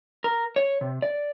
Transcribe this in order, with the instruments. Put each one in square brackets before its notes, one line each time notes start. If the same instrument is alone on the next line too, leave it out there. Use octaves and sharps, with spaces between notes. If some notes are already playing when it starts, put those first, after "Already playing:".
[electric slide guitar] A#4
C#5
C3
D5